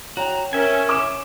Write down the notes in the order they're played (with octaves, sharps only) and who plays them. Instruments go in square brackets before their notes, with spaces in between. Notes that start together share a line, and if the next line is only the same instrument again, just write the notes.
[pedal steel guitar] F#4 [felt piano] C#5 G5 [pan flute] A#5
[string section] C#4 [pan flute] A#4 [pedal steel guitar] E5 G#5
[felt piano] D6 E7